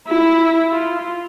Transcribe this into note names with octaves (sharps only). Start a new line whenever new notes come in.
E4
F4